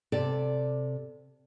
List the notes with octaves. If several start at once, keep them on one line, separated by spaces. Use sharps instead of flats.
C3 A4 D5